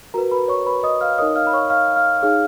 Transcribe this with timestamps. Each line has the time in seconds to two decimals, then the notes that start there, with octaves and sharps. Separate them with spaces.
0.14 F#4 A#4 B4 A#5
0.31 B4 B5
0.48 C#5 C#6
0.66 B4 B5
0.83 D#5 D#6
1.01 F5 F6
1.18 D#4 A#4 C#5 D#5 D#6
1.36 F5 F6
1.47 B5
1.53 C#5 C#6
1.70 F5 F6
1.96 F5 F6
2.22 D#4 G#4 C#5 F5 F6